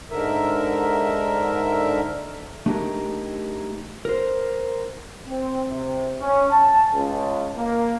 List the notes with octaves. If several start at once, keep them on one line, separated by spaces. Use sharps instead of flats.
G#2 D3 A#4 E5
A3 D4 D#4 G4 G#4 A#4
A#4 C5
C4
C3
C#4
A5
C#2
A#3